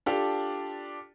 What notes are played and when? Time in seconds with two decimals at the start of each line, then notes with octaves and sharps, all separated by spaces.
0.06 D4 F4 G4 A4